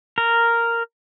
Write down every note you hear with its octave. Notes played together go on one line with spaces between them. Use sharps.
A#4